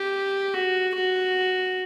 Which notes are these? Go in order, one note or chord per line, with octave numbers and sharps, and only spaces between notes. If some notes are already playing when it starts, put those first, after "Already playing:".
Already playing: G4
F#4
F#4